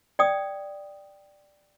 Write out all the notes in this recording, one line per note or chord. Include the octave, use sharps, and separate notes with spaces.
D5 G5 D#6